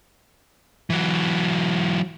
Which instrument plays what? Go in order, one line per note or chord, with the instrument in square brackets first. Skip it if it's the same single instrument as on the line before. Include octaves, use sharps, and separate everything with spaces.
[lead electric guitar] E3 F#3